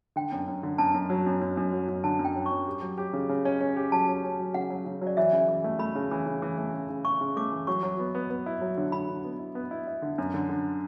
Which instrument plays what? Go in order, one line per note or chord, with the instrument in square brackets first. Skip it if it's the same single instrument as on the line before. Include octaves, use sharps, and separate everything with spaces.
[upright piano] D3 [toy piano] G5
[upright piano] F#2
F#2
D3
[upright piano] F#2 [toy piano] A5
[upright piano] F#2
F#3
F#2
F#2
F#2
F#3
F#2
[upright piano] D3 [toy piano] A5
[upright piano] F#2
[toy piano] G5
[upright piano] F#3
[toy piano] C#6
[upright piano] F#2
G4
F#3
G4
C#3
C#3
C#4
C#4
G4
[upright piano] F#3 [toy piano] A5
[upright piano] C#4
C#4
F#3
[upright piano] C#3 [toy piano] F#5
[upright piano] F#3
C#3
F#3
[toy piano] D5
[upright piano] E3 [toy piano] E5
[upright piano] C#3
E3
A3
[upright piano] A3 [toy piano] B5
[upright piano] C#3
E3
C#3
E3
A3
C#3
C#3
[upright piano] C#3 [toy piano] C#6
[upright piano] C#3
[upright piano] A3 [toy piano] D6
[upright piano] E3
[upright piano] F#3 [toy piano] C#6
[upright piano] F#3
B3
B3
B3
E4
F#3
D3
[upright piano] D3 [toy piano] B5
[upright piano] D3
B3
E4
B3
E4
E4
D3
F#2
D3
D3